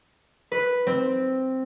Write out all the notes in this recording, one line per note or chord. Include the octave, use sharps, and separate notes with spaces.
B4
C4